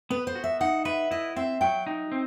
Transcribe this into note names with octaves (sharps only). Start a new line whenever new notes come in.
B3 B4
C5
F#4
E5
D#4 F#5
B4 E5
E4 D#5
C4 E5
F#3 G5
D#4
C4